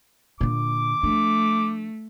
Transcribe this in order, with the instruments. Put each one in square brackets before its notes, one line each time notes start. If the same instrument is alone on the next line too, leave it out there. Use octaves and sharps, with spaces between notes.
[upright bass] A#2 D3 [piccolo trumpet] D6
[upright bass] F3 D4 [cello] A3